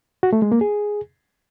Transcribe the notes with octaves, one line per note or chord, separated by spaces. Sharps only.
F#4
A3
G#3
A#3
G#4